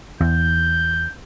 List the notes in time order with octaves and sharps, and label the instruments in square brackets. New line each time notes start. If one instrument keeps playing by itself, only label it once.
[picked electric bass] E2 [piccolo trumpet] G6